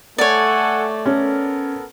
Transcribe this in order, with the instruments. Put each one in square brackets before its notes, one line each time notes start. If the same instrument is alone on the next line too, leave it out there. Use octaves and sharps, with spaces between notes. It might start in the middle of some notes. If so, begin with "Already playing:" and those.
[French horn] A3 [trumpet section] A4 F#5 G#5 [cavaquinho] C#5 D5
[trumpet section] B3 A4 A#4 [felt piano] C#4